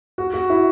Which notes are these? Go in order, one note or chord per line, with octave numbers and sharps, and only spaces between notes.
F#4
F#4
E4